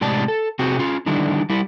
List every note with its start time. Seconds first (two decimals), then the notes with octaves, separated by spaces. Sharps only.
0.01 A2 C3 G#3 D5 A5
0.28 A4
0.59 C3 C4 F#4 G#4
0.79 C#4 F4
1.06 D3 D#3 G3 D4 E4
1.49 G3 E4